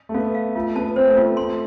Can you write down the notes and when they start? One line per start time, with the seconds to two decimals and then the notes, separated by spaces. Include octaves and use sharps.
0.09 A3
0.14 B3 F5
0.35 F5
0.56 A3 F4
0.76 B3 A5
0.96 C4 C5
1.07 A3
1.17 B3 F4
1.37 A3 C6